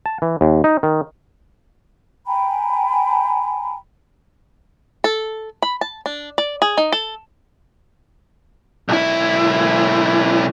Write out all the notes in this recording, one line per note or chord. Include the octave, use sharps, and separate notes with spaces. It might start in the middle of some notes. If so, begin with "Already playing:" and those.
A5
E3
D#2
D#4
D#3
G5 G#5 A#5 B5
A4
B5
A5
D4
D5
G#4
D#4
A4
B1 E4